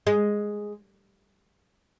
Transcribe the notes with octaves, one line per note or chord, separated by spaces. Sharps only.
G#3